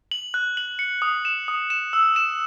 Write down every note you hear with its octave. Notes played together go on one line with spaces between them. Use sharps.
F#7
F#6
F#7
C#7
D#6
E7
D#6
E7
E6
E7